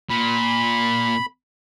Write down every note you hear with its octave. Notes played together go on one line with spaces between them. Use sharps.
A#2 B5